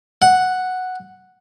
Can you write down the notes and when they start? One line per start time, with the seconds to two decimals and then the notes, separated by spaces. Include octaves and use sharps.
0.22 F#5